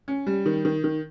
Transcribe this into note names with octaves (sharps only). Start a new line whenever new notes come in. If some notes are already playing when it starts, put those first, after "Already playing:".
C#4
G3
D#3
D#3
D#3